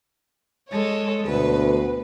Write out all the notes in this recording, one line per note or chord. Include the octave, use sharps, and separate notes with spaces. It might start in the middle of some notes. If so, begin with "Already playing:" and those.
G#3 A4 C#5
D2 B2 B4